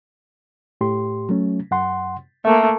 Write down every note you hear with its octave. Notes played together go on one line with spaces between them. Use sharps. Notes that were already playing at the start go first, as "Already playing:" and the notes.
A2 G4 C6
F#3 A3 C#4
F#2 F#5 C6
A3 A#3 E5